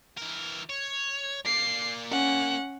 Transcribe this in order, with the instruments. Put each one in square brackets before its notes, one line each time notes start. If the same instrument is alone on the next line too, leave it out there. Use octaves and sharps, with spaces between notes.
[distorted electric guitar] E3 A#4
C#5
[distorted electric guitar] A#3 D5 [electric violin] C7
[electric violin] C#4 F#5